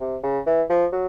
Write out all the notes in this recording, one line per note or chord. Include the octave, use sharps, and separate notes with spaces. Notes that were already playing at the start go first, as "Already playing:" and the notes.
C3
C#3
E3
F3
F#3